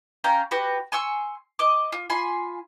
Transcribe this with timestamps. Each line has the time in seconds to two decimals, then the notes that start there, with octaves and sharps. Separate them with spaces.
0.24 C#4 F5 G5 A#5
0.51 F#4 G4 B4
0.92 G#5 C6 C#6 E6
1.59 D#5 D6
1.92 F4
2.10 F4 G#5 B5 C6